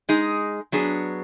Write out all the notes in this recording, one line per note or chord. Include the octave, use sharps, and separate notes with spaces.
G#3 D#4 G#4
F#3 B3 D4 G#4